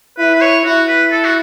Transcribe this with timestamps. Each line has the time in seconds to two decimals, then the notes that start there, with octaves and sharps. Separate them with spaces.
0.18 E4 B4
0.35 B4
0.42 C#5
0.65 E4 F#4
0.88 B4
1.11 A4
1.25 F#4